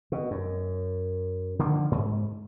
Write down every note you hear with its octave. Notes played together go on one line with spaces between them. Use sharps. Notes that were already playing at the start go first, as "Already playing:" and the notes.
B2
F#2
D3 D#3 F3 A#3
G#2